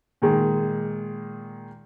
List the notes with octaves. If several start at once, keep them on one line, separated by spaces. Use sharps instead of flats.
A#2 D#3 G#3